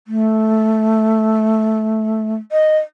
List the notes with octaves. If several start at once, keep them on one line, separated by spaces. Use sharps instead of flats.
A3
D#5